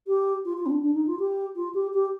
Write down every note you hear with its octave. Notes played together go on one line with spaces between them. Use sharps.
G4
F4
F4
C4
D4
D4
D#4
F4
G4
F4
G4
G4